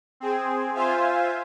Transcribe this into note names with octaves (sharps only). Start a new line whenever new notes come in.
C4 G#4
F4 C5 E5 F5 G#5